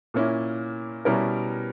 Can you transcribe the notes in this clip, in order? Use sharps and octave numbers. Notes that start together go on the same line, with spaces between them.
A#2 A#3 C#4 E4
B2 G3 C#4 E4 A#4